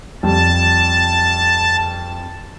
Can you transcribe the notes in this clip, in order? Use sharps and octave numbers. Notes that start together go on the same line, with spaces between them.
F2 G3 A5